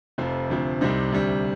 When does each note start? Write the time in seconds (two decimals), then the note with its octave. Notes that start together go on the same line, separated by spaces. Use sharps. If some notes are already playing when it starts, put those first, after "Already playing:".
0.18 F1 F2 C3 F3
0.50 D2 C3 F3
0.81 C2 C3 G3 C4 D#4
1.12 D2 C3 G3